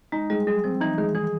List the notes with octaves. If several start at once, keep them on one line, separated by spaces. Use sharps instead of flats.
G#3 D#4
G3 G#3
F#3 G#4
F3 C4
E3 D#4
D#3 G#3
E3 G#4